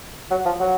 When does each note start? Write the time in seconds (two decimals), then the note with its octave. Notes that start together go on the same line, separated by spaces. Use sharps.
0.31 F#3
0.45 F3
0.60 F#3